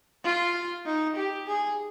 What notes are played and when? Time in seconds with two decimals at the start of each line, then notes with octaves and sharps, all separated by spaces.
0.24 F4
0.86 D#4
1.16 G4
1.46 G#4